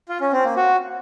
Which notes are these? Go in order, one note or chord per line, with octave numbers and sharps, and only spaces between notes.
F4
C#4
C4
A#3
F#4